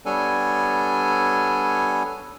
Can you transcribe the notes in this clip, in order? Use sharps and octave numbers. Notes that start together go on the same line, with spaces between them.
G3 B3 D4 A4 C#5 G#5